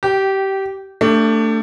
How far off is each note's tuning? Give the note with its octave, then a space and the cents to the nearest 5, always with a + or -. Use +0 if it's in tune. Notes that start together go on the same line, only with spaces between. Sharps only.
G4 -20 G5 -5
A3 +25 D4 +0 G4 +35